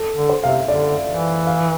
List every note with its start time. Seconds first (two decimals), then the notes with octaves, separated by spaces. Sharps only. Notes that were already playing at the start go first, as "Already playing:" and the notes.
Already playing: A4
0.16 D3
0.29 C5
0.43 C3 F5
0.49 E5
0.68 D3 D5
1.08 E3
1.47 F5